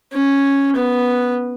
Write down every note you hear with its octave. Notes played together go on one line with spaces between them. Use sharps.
C#4
B3